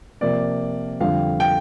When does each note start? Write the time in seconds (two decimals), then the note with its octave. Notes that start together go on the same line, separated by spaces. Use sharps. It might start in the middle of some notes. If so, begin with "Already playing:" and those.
0.21 C3 F3 A#3 D5
1.00 F2 D3 G3 F5
1.40 G5